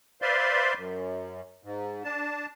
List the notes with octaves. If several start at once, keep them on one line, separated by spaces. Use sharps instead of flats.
B4 C5 D5 E5 F5 C6
F#2
G#2
D4 A5